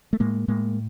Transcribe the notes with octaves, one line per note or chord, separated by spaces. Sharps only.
A3
A2 G#3 A#3
A2 G#3 A#3